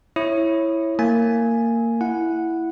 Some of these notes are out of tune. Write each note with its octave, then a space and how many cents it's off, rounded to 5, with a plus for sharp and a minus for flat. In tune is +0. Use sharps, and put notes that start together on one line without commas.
E4 +0 C#5 -15 D#6 -20
A#3 -20 G#5 +0
E4 +5 F#5 -10